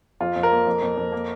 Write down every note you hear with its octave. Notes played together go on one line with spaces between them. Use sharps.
F2 F4
F2
A#4
A#3
F2
F2
F2
A#3